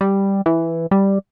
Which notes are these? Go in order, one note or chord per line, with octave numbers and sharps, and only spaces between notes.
G3
E3
G3